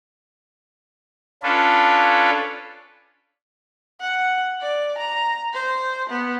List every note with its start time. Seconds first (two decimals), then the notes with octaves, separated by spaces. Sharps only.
1.43 C#4 D4 F4 A4 B4
4.01 F#5
4.61 D5
4.98 A#5
5.54 C5
6.09 B3